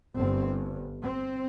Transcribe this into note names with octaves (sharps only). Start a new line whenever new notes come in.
G1 G2 C4
C4